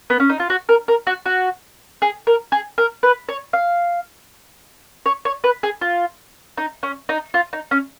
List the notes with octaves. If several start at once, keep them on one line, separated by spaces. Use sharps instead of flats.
B3
C#4
D#4
F4
F#4
A#4
A#4
F#4
F#4
G#4
A#4
G#4
A#4
B4
C#5
F5
C#5
C#5
B4
G#4
F4
D#4
C#4
D#4
F4
D#4
C#4